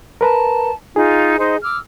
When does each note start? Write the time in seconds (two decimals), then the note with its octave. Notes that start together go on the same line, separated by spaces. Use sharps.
0.21 A#4 B4 A5 A#5
0.96 D#4 F4 G#4
1.38 D#4 C5 D#5
1.63 D6 E6 F6